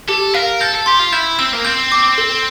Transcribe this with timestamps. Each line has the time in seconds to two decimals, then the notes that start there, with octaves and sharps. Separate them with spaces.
0.09 G4 A4
0.34 A#4 F5
0.61 A4 G6
0.74 A4
0.86 G4 C6
0.99 F4
1.12 E4 G6
1.39 C4 E6
1.53 A#3
1.65 C4 G6
1.92 D6
2.18 A4